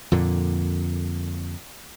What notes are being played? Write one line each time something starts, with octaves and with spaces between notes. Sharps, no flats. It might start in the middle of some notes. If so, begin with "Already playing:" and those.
F2 A#2 D3